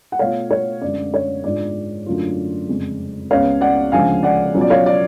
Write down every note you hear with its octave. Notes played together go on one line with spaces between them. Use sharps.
F#5
B2 A3 F4 C#5 F5
C#5
F#2 D3 G#3 D5
C#5
G#2 G#3 D4 F4 D5
F#2 D3 F#3 A3 F4
F2 C#3 G#3
C#2 C#3 G#3 B3 C#5 F5
D5 F#5
D2 C#3 F3 G#3 F5 G#5
D5 F#5
B2 F#3 C#4 F4
D5
C#5 F5
D5